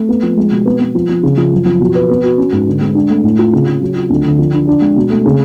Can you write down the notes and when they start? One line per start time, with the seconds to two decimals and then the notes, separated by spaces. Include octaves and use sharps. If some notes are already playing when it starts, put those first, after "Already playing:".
Already playing: A3
0.09 B3
0.23 F3
0.37 G#3
0.51 B2
0.66 B3
0.80 B3
0.95 F3
1.09 F3
1.23 C#3
1.37 F3
1.52 F#2
1.66 F3
1.80 B2
1.95 B4
2.10 B3
2.23 F#4
2.38 C#4
2.52 G#2
2.67 D3
2.81 G#3
2.95 D4
3.10 A3
3.24 A2
3.39 F4
3.53 C#3
3.67 C#3
3.81 F#3
3.95 F4
4.10 D2
4.24 D3
4.39 F3
4.53 D4
4.67 D4
4.81 G#3
4.96 B2
5.10 A3
5.25 C#3